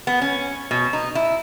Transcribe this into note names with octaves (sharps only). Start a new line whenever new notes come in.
B3
C#4
B2
D#4
E4